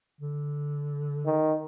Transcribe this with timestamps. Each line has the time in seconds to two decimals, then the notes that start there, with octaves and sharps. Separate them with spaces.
0.21 D3
1.26 D#3